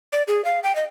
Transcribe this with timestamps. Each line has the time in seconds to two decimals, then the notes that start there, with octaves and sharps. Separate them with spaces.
0.13 D5
0.28 G#4
0.45 F5
0.63 G5
0.76 D#5